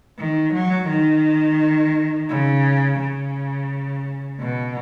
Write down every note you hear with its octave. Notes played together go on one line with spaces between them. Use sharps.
D#3
F#3
D#3
C#3
C#3
B2